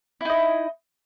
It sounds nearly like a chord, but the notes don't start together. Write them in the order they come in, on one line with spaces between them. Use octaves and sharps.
E4 D#4 D#5